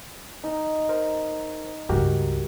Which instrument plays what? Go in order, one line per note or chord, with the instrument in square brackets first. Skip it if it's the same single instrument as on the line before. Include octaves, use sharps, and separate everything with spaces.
[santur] D#4
[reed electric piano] A#4 C5
[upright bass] C#2 G2 [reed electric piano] F#4 G4 A#4